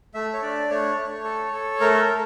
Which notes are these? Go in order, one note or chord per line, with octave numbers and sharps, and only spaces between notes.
A3 E5
C#5
D4 D5
A3 C#5
A3
A4
A4
A3 A#4
A3